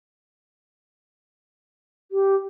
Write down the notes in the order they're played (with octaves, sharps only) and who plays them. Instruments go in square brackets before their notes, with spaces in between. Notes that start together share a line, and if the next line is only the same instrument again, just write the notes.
[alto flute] G4